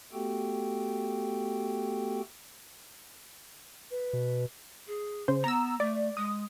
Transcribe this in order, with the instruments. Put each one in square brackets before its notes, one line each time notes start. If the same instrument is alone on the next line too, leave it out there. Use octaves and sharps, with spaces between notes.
[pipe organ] A3 B3 F#4 G4 A4 G5
[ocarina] B4
[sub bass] B2
[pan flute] G#4
[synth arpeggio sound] C#3 C5
[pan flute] B3 [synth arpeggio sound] A#5 E6
[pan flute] A3 [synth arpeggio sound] D5
[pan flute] G#3 [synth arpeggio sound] D#6